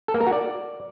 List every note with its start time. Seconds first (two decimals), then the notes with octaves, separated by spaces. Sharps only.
0.08 A4
0.14 A#3
0.20 A#4
0.26 F#4
0.33 D5